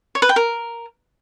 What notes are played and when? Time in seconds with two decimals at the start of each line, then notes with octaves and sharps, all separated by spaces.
0.15 C#5
0.22 B4
0.29 G5
0.36 A#4